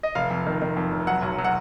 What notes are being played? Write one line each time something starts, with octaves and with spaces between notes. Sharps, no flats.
D#5
F1 F5
F2
D#3
D#3
F2
F1
F#3 F#5
B1
F#3
F#5